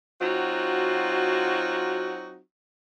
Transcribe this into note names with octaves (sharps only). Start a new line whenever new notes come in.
F#3 C4 D#4 F4 F#4